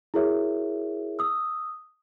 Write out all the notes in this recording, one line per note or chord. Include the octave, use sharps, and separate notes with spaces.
E4 F#4 G#4 A#4 C#5 E5
D#6 E6